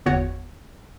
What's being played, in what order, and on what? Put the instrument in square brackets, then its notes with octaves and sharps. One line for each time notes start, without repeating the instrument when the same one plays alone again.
[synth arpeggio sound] G1 E2 F#4 C#5 F#5